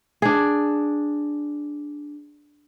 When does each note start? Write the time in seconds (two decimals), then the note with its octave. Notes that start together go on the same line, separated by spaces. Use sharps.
0.22 D4 G#4